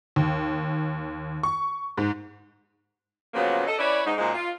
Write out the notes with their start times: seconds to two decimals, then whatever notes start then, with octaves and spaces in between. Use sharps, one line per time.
0.16 D#2
1.43 C#6
1.98 G#2
3.34 A#2 C#3 F3 F#3 A#3 B3
3.67 A4 D#5
3.78 C#4 E4 B4 C#5 D5
4.05 G#2 D#4
4.17 F#2 A#2 C#3 F3 G#3
4.34 F4